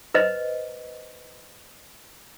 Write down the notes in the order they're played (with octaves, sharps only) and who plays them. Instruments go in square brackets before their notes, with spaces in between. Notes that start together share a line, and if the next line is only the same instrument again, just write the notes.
[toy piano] B4 C5 D#5